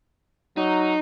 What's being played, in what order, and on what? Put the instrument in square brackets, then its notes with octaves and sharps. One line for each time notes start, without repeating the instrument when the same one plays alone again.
[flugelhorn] F#3 [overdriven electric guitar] D#4